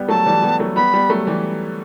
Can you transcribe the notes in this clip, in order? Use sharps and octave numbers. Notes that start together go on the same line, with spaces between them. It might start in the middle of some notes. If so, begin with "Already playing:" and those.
Already playing: G3 B3
F#3 A3 A5
E3 G3
G3 B3
F#3 A3
G3 B3 B5
G3 B3
F#3 A3
E3 G3